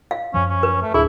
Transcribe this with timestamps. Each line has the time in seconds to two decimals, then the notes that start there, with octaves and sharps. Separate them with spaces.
0.11 F5
0.34 F#2 F3 C#4
0.50 C#4
0.63 B4
0.82 A3
0.94 D1 D4 E4 G#4